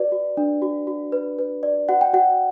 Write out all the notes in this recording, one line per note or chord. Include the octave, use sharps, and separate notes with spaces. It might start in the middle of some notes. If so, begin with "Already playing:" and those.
Already playing: F#4 B4 D5
F#4
D4
F#4
F#4
B4
B4
D5
F#4 F#5
G5
F#4 F#5